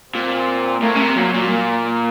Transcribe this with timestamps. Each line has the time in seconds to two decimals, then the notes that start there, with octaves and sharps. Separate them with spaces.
0.14 A#2 C4
0.82 A2 A#3
0.95 C#3
1.00 C3
1.17 A#2 F#3
1.34 A#2
1.51 A#3